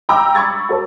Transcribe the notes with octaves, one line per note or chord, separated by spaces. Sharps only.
G5 A#5 B5 D6 E6
B5 C#6 G#6 A6
F#4 A#4 A5